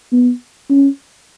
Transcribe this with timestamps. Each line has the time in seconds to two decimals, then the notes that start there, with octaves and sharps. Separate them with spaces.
0.12 B3
0.70 C#4